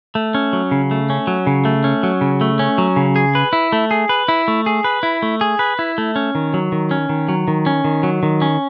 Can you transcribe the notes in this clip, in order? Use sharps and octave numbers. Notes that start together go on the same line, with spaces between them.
A3
C#4
F#3
C#3
A3
C#4
F#3
C#3
A3
C#4
F#3
C#3
A3
C#4
F#3
C#3
G#4
B4
E4
A3
G#4
B4
E4
A3
G#4
B4
E4
A3
G#4
B4
E4
A3
C#4
D#3
F#3
D#3
C#4
D#3
F#3
D#3
C#4
D#3
F#3
D#3
C#4